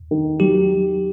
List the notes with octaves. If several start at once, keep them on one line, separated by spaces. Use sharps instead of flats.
D#3
F#3 G4